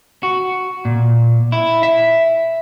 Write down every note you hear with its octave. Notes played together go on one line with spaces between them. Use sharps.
F#4
A#2
E4
E5